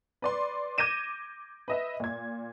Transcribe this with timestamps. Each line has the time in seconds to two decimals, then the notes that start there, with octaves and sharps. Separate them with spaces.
0.22 B4 D5 C6
0.78 D6 G6 G#6 A#6 D#7 E7
1.68 B4 D#5 E5
2.00 A#2 G#6